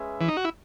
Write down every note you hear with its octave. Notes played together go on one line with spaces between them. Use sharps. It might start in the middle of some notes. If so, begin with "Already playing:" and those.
Already playing: G#3 C#4 G#4 B4 E5
E3
D#4
F#4
E4